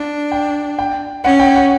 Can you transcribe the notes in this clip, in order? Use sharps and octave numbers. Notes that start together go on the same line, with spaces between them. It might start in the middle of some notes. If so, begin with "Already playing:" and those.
Already playing: D4
G5
G5
C#4 F#5
G5
F#5